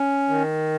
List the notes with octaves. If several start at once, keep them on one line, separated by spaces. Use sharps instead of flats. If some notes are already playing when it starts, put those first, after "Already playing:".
Already playing: C#4
D#3